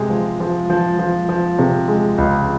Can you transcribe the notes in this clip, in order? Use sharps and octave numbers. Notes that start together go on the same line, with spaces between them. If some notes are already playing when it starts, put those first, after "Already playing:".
Already playing: C3 G#3
F3
F3
F3
F3
F3
C3
G#3
C#2